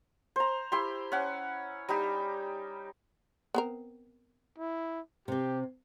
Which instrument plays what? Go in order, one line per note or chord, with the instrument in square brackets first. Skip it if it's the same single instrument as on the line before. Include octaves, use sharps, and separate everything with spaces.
[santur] C5 A#5
E4 G4 C6
C#4 F#5
G3 D#4 G4
[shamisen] B3 C4 A#4
[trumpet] E4
[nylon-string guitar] C3 C4 [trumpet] G4